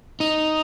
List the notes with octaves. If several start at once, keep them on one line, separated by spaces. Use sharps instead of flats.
D#4